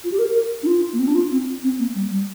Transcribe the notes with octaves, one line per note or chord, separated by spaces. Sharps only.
F4
G4
A#4
A#4
D4
F4
A#3
C4
D4
F4
C4
C4
A#3
G3
G3